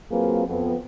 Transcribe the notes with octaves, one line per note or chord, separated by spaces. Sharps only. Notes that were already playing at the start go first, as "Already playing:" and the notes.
F#3 A#3 C4 F4 G#4 B4
F2 B3